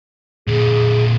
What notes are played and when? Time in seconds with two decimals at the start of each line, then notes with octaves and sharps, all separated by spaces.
0.48 A#2 D3 G#4